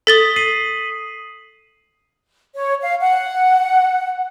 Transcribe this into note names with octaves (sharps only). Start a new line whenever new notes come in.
A4 D#6 A6 B6 G7
C7 D#7 F#7
C#5
F5
F#5